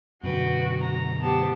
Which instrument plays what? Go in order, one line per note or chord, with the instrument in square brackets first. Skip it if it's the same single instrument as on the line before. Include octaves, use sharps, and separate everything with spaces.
[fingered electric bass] F#2 B2 D3 [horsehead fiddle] F#4 [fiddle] B4 G5
[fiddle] A#5
[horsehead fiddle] B3 G4 [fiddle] C5 A5